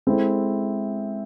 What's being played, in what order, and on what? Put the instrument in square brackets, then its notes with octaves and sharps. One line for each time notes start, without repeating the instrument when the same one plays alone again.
[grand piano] G#3 C4 E4 A4